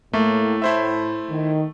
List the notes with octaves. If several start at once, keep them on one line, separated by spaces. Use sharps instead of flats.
A2 A3 A#3
E4 C5 E5
D#3